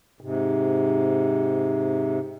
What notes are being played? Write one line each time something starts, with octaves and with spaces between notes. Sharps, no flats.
G#2 C3